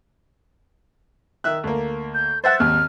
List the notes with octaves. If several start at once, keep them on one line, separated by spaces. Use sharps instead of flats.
D#3 E5 F#6
D2 A#3
G6
C5 E5 F#5 A6
G#1 D#2 F6